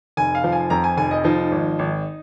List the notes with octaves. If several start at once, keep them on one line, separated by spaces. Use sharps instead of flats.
F1 G#5
F5
F3
G#5
F2 A#5
G#5
F1 G#5
D#5
F3 D#4
G#1
G#1